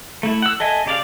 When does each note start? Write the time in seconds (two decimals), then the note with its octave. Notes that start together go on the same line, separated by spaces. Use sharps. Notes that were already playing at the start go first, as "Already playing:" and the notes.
0.23 A3 E4
0.42 F#5 E6
0.60 A4 D#5 E5 G#5
0.86 C#3 G4 D5 F5